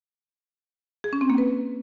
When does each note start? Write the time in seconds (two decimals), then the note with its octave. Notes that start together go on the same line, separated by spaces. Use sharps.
1.04 G#4
1.13 C#4
1.21 C4
1.30 A#3
1.38 B4